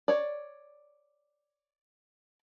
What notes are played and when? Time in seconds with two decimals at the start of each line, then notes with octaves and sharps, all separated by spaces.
0.08 C#5 D5